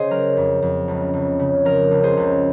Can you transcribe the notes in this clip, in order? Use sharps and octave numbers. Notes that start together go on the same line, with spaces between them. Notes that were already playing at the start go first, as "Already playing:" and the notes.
Already playing: C#3 G#4 C5 D#5
F#3 A#4
F2
F2
C#2
C#2
C#3
F3 A#4
C#2
G#4 C5
C#2